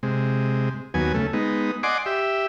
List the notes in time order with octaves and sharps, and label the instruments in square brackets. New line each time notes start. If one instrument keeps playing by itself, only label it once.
[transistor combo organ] C3 G#3
D#2 F#3 B3 G#5
C#3 A3
G#3 B3 D#4
D5 D#5 F#5 G#5 C6 D6
G4 E5